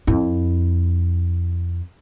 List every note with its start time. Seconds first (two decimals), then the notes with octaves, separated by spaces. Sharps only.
0.07 F2 E4